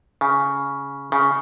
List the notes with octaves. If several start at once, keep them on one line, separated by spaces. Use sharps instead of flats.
C#3
C#3